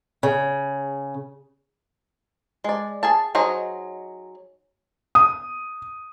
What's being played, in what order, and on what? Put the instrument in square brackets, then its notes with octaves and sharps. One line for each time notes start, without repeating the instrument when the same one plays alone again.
[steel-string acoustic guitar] C#3
[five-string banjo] G#3 D5
G#4 G#5 A5
F#3 D#4 G#4 C5 D#5
[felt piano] D#6